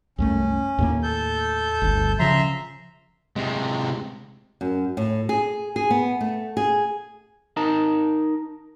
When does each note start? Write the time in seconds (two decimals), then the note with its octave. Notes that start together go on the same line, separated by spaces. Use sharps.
0.18 C2 F#2 A3 C#4
0.78 D#2 A2 A#3
1.03 A4 G6
1.82 G1 D2
2.19 C#3 F3 E5 A#5 C6
3.36 C3 G#3
4.61 F#2
4.97 A2
5.29 G#4
5.76 G#4
5.91 B3
6.21 A3
6.57 G#4
7.57 D#4 A#4 A5